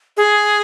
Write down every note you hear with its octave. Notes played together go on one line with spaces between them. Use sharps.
G#4